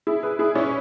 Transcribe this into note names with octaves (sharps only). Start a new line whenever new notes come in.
E4 G#4
G#4 B4
E4 G#4
C#4 E4